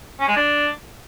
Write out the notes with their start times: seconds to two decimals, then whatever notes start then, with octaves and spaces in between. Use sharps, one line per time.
0.20 C#4
0.28 G#3
0.36 D4